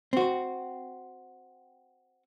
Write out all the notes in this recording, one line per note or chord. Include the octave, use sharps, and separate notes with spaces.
C4 F#4